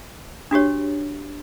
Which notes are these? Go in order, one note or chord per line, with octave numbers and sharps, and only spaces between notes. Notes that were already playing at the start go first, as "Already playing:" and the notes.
D4 F#4 G4 C#5